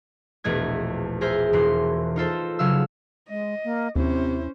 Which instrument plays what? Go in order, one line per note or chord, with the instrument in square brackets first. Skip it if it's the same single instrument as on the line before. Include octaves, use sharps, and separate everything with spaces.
[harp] E1 A#1 E2 A3 D#5 G#6
G#4 A#4 C5 E5
E1 E3 C6
D#4 F4 A4 C5
C#3 F#3 F5 E6
[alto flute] G#3 [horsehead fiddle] D#5
[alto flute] A#3
[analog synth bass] D#2 [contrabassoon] C3 [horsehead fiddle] C#4 C5 [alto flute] E4